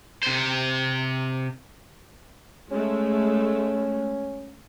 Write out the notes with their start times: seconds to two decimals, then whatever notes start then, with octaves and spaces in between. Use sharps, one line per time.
0.23 C3 C5
2.71 G#3 A3 C#4